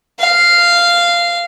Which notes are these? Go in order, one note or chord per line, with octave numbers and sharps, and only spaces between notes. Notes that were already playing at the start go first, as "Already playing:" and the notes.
F5